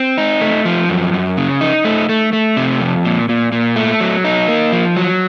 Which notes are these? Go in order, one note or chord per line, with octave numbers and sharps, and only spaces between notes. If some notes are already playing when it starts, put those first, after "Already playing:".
Already playing: C4
D#4
A3
F3
F#2
F#2
C#3
D#4
A3
A3
A3
C3
F2
A#2
A#2
A#2
A3
F#3
D#4
A#3
F3
F#3